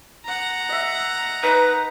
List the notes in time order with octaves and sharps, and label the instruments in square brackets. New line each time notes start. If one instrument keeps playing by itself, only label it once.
[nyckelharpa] F#5 A#5
[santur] D#5 E5
[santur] D#4 B5 [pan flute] B4